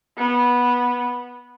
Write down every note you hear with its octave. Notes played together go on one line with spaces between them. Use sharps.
B3